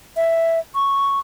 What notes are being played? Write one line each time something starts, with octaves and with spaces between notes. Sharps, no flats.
E5
C#6